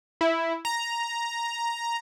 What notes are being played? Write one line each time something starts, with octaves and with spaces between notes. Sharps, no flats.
E4
A#5